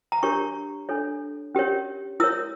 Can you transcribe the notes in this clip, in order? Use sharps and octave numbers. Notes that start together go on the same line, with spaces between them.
A#5
D4 G4 A#4 C#5 C#6
D4 A4 C#5
C#4 G4 A#4 C#5
E4 A#4 C#5 E6